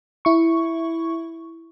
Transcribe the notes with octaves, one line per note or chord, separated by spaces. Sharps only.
E4 C#6